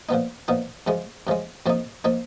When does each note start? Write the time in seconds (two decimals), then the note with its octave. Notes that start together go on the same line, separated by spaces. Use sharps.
0.09 A#2 F3 B3 D#4
0.48 A#2 F3 B3 D#4
0.87 F#2 C#3 F3 G#3
1.27 F#2 C#3 F3 G#3
1.66 F2 F3 A#3 D#4
2.04 F3 A#3 D#4